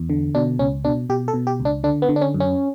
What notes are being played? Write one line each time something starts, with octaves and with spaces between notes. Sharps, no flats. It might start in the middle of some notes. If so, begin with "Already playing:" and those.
Already playing: E2
D3
B2 D4
C#2 C#4
B2 D4
B2 G4
A4
B2
G4
C#2
D4
D3 D4
B3
D3
D4
C#4
F#2
C#4